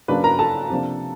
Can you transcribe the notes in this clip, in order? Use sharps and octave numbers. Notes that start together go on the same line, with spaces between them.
C#3 F#3 A#3 D4 B4 B5
A#4 A#5
A4 A5
C3 F3 A#3 D4